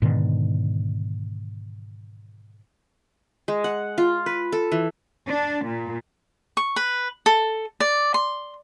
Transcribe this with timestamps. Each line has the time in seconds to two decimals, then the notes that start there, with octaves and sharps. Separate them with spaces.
0.02 G#2 B2 D3 D#3
3.48 G#3
3.64 F#5
3.98 F4
4.26 B4
4.52 A4
4.72 E3
5.27 D4
5.66 A#2
6.57 C#6
6.76 B4
7.26 A4
7.80 D5
8.14 C6